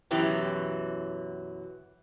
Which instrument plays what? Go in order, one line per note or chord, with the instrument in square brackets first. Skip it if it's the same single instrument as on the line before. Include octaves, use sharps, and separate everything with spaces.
[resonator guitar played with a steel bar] F#2 B2 E3 F#3 G4